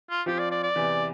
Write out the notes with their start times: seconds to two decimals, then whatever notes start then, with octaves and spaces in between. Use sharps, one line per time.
0.10 F4
0.26 F3 C4 F4 G4
0.39 D5
0.51 D5
0.63 D5
0.76 E2 C3 E3